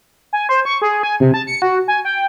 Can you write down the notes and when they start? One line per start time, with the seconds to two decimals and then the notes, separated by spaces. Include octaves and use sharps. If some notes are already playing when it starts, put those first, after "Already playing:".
0.33 G#5
0.49 C5
0.65 C#6
0.82 G#4
1.03 G#5
1.20 C3
1.34 A5
1.47 C#7
1.62 F#4
1.88 G#5
2.05 G5